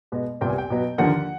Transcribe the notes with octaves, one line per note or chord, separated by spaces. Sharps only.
B2 G#3 B3
C2 A#2 G3 B3 G5
G#5
G5
B2 F#3 B3
D#2 D3 F3 A#3 F#5